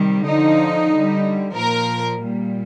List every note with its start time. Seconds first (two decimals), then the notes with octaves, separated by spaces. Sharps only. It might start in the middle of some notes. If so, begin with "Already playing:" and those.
Already playing: C3 D#3 G3
0.25 D3 F3 D#4
0.90 D3 G3
1.55 A#2 F3 A#4
2.20 A#2 G3